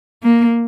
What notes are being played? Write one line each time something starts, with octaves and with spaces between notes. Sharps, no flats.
A#3